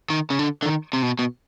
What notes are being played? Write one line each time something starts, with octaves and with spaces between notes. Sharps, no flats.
D#3
C#3
D3
D3
D#3
C3
B2
B2